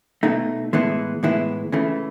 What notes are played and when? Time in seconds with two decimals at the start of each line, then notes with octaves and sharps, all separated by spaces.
0.23 B2 A3 D#4
0.73 A2 E3 G#3 B3 E4
1.23 A2 E3 G#3 B3 E4
1.72 C#3 E3 A3